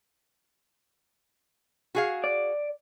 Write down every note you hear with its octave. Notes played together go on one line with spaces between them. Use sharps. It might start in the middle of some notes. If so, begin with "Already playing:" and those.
F#4 G#4 F5
D5